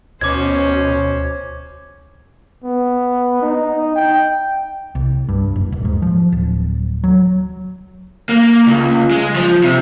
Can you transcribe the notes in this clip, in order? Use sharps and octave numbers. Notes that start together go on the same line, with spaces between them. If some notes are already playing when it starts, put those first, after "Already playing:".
D2 B2 C#4 C5 D6 G#6
B3
D#4
G5
C2
G2
F#1
D#1
G#2
F3
D1
F#3
A#3
C#2
G#3
F3
C3